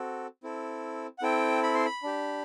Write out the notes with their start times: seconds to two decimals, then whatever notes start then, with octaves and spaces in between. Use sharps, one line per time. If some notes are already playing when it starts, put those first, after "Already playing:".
Already playing: C4 F#4 A4
0.43 C4 E4 A4
1.18 F#5
1.22 C4 E4 A4 G5
1.63 B5
1.74 C6
1.85 B5
2.03 D4 G4